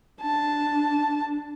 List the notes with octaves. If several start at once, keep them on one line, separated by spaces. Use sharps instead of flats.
D4 A5